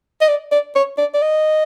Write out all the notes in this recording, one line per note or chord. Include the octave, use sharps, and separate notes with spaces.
D#5
D5
D5
C#5
D5
D5
D#5